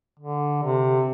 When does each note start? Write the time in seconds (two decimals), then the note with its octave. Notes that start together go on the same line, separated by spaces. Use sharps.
0.19 D3
0.63 C3